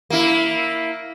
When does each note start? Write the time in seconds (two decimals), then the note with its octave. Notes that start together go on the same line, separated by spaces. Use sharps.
0.10 A#3 E4